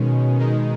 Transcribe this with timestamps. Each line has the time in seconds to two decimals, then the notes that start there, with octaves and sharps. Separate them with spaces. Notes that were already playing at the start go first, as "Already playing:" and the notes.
Already playing: B2 D#3 G#3 C#4
0.39 D#3 G#3 D#4